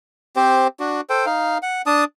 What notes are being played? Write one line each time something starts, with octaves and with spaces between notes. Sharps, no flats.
C4 G4 C5
D4 F#4
A4 C5 G5
D#4 F5
F#5
D4 A5 D#6